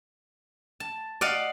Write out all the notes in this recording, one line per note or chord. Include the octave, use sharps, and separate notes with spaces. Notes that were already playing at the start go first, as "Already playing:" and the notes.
A5
D5 D#5 F5 F#5